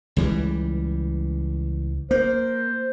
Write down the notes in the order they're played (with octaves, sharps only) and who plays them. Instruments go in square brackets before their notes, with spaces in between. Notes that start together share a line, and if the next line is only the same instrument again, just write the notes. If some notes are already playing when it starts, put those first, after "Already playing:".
[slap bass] C#2 E3 G3
[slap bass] A#3 [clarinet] C5